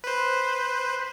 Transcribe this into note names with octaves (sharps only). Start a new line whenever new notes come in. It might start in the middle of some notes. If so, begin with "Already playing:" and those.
B4 C5